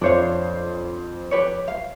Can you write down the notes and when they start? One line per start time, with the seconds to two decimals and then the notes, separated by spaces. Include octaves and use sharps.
0.01 F2 D4 C5 C#5 F5
1.31 G4 B4 C#5
1.68 F5